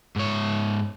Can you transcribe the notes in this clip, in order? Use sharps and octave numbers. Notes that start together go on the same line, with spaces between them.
G#2 C#5